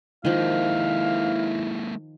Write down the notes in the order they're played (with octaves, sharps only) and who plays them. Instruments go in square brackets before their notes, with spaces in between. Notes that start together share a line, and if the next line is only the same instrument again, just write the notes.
[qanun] D#3 F3 [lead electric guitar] G#3 A#3 [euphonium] E4 [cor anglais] F5